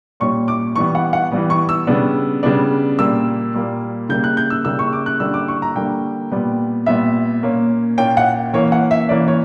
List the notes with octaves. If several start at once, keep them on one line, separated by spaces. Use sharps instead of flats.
A#2 G3 C#4 C#6
D6
E3 G3 B3 C#6
F#5
F#5
E3 G3 B3
C#6
E6
C#3 G3 B3 D4
C#3 G3 B3 D4
A#2 G3 A#3 E6
A#2 G3 A#3
C#3 G3 A#3 G6
F#6
G6
E6
C#3 G3 A#3 E6
C#6
D6
F#6
D3 G3 A#3 E6
D6
C#6
A#5
D3 G3 A#3 G5
A#2 G3 B3
A#2 G3 B3 E5
A#2 A#3 C#4
A#2 A#3 C#4 G5
F#5
E3 A#3 C#4 C#5
F#5
E5
E3 A#3 C#4 D5
C#5